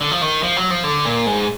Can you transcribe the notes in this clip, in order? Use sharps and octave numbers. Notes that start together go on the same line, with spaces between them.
D3
F3
D#3
F3
F#3
F3
D3
A#2
G#2